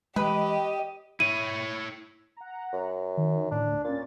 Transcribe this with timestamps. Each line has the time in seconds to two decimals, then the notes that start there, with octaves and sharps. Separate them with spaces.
0.16 E3 G#3 G4 B4 D#5
1.20 E4 C#5 D#7
2.37 F#5 A#5
2.73 F#2
3.17 D#3
3.51 D2 A2 D4
3.84 A#2 C#4 A#4 A6